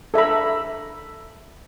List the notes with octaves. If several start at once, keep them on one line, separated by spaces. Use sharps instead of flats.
A4 E5 A#5 B5